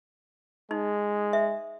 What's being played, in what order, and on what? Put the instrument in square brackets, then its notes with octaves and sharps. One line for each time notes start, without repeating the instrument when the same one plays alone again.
[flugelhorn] G#3 [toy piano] D#4
[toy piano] E5